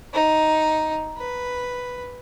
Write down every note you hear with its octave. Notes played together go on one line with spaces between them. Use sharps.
D#4
B4